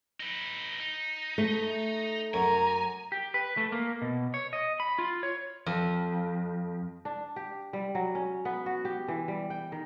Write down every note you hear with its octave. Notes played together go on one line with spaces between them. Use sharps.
D#4 B4
D#4
A3
F#2 G#5 A#5
G4
B4
A3
A#3
B2
C#5
D#5
B5
F4
C#5
F2
D4
G4
G3
F#3
C#4
B3
F#4
G4
E3
G3
G5
D#3